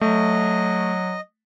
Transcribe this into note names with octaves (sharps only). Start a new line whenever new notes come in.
F#3 A3 D#5